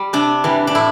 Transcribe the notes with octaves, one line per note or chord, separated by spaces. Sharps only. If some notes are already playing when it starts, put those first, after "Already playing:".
Already playing: G3
C3 D4
E3 G3
D4
A2 E4